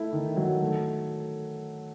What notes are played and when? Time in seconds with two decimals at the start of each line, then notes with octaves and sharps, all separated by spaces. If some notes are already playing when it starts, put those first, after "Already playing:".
Already playing: A3 E4
0.13 D#3
0.36 F#3
0.60 A3